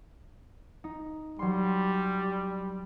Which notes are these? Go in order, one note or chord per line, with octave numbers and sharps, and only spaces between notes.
D#4
F#3 G3 C6